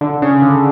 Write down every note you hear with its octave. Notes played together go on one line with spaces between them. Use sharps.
D3
C#3
D3